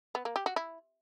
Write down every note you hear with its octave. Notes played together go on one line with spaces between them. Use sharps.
B3
A#3
G4
F#4
E4